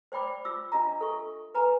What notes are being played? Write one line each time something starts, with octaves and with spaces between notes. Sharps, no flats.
C5 D5 G5 B5 D6
F4 D6 E6
D4 F4 D#5 E5 A#5
A4 C#6
B4 G#5 A#5